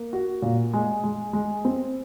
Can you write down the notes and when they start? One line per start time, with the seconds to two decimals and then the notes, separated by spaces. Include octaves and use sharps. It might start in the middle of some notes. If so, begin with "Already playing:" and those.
Already playing: A#3
0.13 F#4
0.42 A#2
0.73 G#3
1.04 G#3
1.33 G#3
1.65 C4